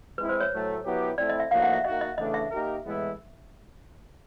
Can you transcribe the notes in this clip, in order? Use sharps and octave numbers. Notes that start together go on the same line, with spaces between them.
G#3 C4 E4 B4
C5
C#5
A2 F#3 A3
F#3 B3 E4 G4
A3 C4 E4 D5
D#5
E5
A2 F3 A#3 D#4 F#4 F5
F#5
E5
A#3 D#4 F#4 D#5
D#5
C#3 E3 A3 D4 D#5
E5
A#3 D#4 G4 A#4
A2 E3 G#3 B3 E4